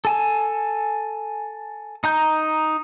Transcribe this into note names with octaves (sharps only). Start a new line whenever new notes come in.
A4 G#5 A5
D#4 A#5 G6